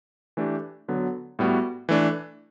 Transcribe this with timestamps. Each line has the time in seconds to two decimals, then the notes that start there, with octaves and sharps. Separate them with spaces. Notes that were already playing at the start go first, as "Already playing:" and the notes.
0.37 E3 A3 D4 G4
0.88 D3 F#3 B3
1.39 A2 G3 B3 F#4
1.89 E3 A3 D4